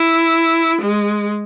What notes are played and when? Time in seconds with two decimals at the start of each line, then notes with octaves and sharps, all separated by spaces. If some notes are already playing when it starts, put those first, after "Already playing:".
Already playing: E4
0.82 G#3